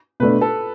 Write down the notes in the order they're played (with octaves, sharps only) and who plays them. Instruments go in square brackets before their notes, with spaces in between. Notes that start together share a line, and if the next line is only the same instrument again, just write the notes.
[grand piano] B2 A3 D4 [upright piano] B4
[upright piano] A4